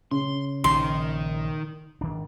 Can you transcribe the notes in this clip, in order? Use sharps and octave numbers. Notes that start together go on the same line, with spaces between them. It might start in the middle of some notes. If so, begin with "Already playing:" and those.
C#3 C6
A#1 D#3 C6
G#1 D#3 D4